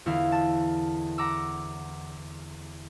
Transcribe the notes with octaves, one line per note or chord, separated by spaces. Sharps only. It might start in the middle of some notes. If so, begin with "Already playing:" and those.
E2 D3 E4 F5
A5
F#5 A#5 D6 E6